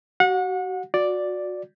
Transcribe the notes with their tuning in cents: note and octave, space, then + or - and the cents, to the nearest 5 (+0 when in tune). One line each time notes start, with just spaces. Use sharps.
F#4 +35 F#5 -30
F#4 -25 D5 +0